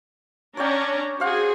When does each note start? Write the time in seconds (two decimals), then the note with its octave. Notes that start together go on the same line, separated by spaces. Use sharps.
0.57 C#4 D4 C#5 D5 G5 A#5
1.20 F#4 G#4 C5 F5 F#5